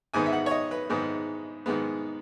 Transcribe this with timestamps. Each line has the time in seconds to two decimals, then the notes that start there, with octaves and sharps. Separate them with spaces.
0.13 G#2 D#3 G#3 B3 G#5
0.26 E5
0.33 F#5
0.46 C#5
0.51 D#5
0.71 B4
0.90 G#2 D#3 G#3 B3
1.66 G#2 D#3 G#3 B3